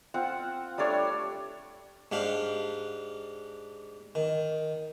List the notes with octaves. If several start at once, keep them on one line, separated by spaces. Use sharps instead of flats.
C4 F4 F#5
G3 A3 D4 C#5
G#2 D4 G4 F5
D#3